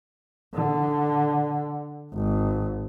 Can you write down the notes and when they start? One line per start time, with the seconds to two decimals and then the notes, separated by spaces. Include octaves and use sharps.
0.54 D3
2.14 G#1